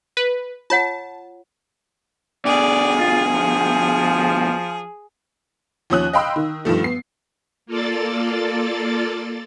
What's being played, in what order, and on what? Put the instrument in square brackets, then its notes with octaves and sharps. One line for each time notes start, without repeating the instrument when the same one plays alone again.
[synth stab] B4
[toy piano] F4 C#5 F#5 [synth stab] A5
[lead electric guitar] B2 D3 [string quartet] G#4 [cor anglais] D5
[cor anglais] F4
F3
[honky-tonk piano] D#2 F3 C#4 D#6 F#6
D#5 F5 G5 B5 C6 E6
D#3
G2 D#3 F3 A3
B3 C7
[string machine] A#3 F4 A4 D5 A6